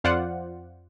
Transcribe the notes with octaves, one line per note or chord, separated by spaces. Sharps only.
F2 F4 C5 D5 F#5